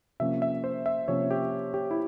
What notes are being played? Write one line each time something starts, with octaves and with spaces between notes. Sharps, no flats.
C3 F3 A#3 C#4 E5
E5
C5
E5
C3 F3 A#3 C#4 C#5
G4
G4
E4